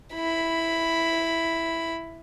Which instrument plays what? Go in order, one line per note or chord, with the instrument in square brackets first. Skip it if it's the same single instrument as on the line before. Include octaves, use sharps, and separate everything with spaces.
[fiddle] E4 B5